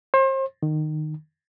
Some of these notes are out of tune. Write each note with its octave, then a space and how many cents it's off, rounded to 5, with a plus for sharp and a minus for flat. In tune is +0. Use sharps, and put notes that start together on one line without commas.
C5 +35
D#3 -20